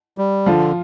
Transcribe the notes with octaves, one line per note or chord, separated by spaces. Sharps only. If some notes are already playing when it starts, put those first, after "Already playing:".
G3
D3 F3 F4